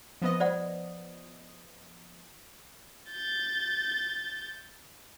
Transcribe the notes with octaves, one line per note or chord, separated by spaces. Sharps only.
F3 B3 D#5
C5 D5 F#5
G6 A6